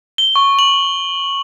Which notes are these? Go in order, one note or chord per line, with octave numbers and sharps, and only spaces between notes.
G7
C#6
F#7